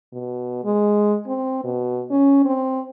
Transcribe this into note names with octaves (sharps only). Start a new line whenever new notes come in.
B2
G#3
C4
B2
C#4
C4